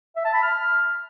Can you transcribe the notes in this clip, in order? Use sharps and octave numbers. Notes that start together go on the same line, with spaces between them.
E5
A5
B5
F6